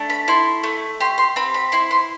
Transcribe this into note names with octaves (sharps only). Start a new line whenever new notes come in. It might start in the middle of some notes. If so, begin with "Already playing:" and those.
Already playing: A3 D4
B5
E4 C6
A3
G4 C6
C6
C4 B5
B5
E4 C6
C6